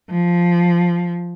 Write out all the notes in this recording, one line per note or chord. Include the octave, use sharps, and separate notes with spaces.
F3